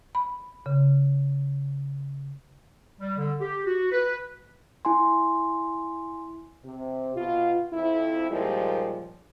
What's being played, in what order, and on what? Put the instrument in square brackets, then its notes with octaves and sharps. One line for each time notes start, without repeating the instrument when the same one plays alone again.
[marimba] B5
C#3
[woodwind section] G3
D3
G4
F#4
B4
[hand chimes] E4 G#5 C6
[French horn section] C3
B2 F4
F2 E4
D#2 A#2 F3 G3 G#3